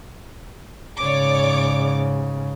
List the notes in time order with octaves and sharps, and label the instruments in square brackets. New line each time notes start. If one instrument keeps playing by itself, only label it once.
[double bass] G#2 C#3 [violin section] C#5 D5 D6